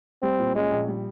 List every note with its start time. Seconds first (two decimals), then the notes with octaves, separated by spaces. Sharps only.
0.22 G3 C4
0.39 A#2
0.55 G#3 C#4
0.71 A#1
0.88 G3